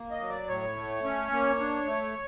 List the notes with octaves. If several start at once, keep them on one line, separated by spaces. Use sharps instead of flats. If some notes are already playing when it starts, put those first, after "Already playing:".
Already playing: A#3
D#5
F#3
D5
A2 C#5
A3
C#4
A#3
D4
A3